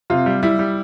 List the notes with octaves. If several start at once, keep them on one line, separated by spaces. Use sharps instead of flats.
C3 F4
G3
G3 E4
G3